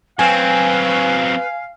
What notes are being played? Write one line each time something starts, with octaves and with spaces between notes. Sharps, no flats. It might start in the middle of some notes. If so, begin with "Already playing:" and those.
F#3 C4 B4 F5 G#5